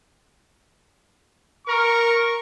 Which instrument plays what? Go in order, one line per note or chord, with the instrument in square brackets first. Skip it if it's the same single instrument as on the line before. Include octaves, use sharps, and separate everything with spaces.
[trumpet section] A#4 [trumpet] C#6